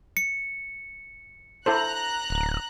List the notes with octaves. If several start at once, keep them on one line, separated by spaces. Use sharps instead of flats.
C#7
E4 A4 C5 A#5 F#6
D1